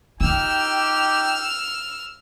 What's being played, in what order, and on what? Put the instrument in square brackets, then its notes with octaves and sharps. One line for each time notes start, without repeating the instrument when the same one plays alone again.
[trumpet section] D#4 G4 G5 [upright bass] F4 [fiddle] E6 F6